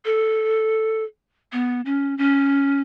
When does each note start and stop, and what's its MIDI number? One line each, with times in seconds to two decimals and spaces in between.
0.05 1.04 69
1.53 1.81 59
1.85 2.16 61
2.18 2.81 61